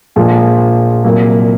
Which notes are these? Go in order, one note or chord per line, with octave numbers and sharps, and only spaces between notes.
A#1 A#2 F3 G#3
C2 A#2 F#3 A#3